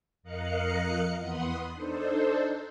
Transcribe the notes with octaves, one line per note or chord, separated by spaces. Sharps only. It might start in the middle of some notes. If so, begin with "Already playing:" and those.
F2 A#4 D#5 F5 F#6 C#7
E2 B3 F#5 B5 C6 D#6
D4 D#4 A4 C5